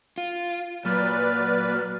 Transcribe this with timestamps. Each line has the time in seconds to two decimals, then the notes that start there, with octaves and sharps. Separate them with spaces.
0.18 F4
0.85 A#2 F#3 B4 D5 F6